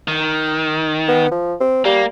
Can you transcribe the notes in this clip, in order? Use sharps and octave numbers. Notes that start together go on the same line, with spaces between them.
D#3
B3
F3
C4
G3 A#3